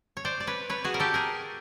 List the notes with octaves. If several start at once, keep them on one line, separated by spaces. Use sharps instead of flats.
C#5
C5 D5
D5
B4 C#5
B4 C#5
F#4 G#4
A#4
G4 A4
G#4 A#4